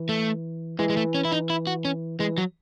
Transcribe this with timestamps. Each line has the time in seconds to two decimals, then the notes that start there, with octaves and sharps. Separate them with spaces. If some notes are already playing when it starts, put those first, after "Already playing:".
Already playing: E3
0.09 A3
0.79 E3 G#3
0.90 G#3
0.97 A3
1.15 C#4
1.25 E4
1.32 D#4
1.50 E4
1.67 F#4
1.85 C#4
2.19 E3 G#3
2.38 F#3